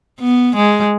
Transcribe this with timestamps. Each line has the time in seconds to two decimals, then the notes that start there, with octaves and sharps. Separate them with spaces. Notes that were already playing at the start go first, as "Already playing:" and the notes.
0.19 B3
0.55 G#3